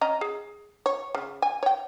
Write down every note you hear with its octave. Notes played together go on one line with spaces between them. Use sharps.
C#4 D#5 A#5
G#4
C#5
C#3
G#5
C#5 G5